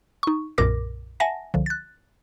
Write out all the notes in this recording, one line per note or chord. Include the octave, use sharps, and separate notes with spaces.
D#4 C#6
B1 F#2 A#2 A#4 D6 A#6
E5 F#5 G#5 A5 A#6
C2 D3 F3
F#6 A6